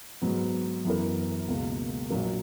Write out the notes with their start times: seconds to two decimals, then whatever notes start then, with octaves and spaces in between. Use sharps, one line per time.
0.22 G#2 F#3 B3
0.85 F#2 E3 B3 E4 A#4
1.48 C#2 B2 A#3
2.10 A#1 A#2 F#3 A#3